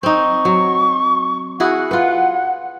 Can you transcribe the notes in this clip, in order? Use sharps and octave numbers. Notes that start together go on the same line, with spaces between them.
C4 D#4 C#6
F#3
E4 F#4 G#4 F#5
F4 B4